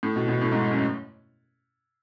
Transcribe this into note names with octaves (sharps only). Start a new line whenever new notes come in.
A2
B2
B2
A2
G#2
F#2